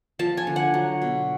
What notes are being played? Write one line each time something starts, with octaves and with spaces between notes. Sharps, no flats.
F3 A5
G#5
D3
F#5
F#3
B2